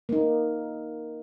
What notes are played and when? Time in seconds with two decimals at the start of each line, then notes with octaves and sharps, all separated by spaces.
0.09 A#3 D#4